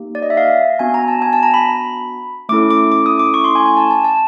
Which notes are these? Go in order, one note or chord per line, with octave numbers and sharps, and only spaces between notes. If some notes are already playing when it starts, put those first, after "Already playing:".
Already playing: A#3 D#4 G4
D5
D#5
E5
F5
B3 D4 F#4 G#5
A#5
A5
G#5
A5
A#5
B5
A3 C#4 E4 A4 D6
D6
D6
D#6
D6
C#6
C6
G#5
G#5
A5
A5
A5